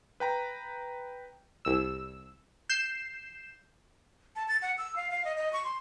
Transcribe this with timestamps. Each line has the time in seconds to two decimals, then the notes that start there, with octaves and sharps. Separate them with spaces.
0.20 B4 G5 A#5
1.65 C2 E6
2.69 G6 C7 E7
4.36 A5
4.48 A6
4.62 F#5
4.78 E6
4.96 F5
5.11 F5
5.25 D#5
5.37 D#5
5.53 C#6
5.64 C6